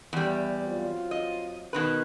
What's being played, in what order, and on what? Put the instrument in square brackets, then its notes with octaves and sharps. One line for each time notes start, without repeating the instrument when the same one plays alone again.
[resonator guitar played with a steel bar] E2 G3
[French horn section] F#3 C4 F4
[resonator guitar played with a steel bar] D#5
B2 D#3 B4